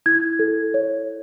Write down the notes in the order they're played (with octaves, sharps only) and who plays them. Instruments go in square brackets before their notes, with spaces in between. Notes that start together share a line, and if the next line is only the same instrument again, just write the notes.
[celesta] E4 G#6
A4
C#5